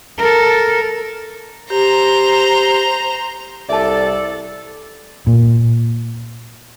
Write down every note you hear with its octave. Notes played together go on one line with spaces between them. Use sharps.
A4 A#4
G4 C5 A#5
C2 A4 D5 E5 A5
A#2